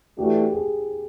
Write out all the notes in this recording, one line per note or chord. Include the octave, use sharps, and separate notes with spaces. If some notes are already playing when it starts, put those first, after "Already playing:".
E3 A3 D4 F#4 G4
G#4